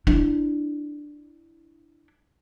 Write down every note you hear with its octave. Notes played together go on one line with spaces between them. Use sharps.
D4 E4